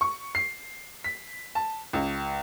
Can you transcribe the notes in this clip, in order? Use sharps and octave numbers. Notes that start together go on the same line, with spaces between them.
C#6
C7
B6
A5
C#2